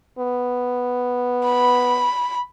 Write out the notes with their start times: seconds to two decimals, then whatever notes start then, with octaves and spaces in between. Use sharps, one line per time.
0.19 B3
1.46 B5